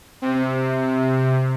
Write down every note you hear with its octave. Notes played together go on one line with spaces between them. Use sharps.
C3